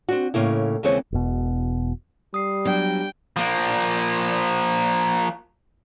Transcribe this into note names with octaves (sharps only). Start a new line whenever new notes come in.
C4 D4 F#4
A2 C#3 A#3 E4
D#2 C#3 E3 G#3 C4 C#5
E1 B2
G3 D#6 C7
F#3 B3 D4 D5 G5
F3 A#3